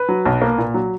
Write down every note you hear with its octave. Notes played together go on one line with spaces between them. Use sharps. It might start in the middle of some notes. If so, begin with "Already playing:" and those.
Already playing: B4
F#3
B1
A#3
A#2
F#3